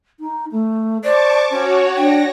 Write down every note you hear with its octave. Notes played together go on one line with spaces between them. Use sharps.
D#4
A3
C5 D5 A5 C#6 D6
C#4 F#4 C#5
D4 G5 A#6